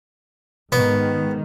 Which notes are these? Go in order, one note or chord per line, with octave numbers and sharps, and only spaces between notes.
G#2 D#3 B3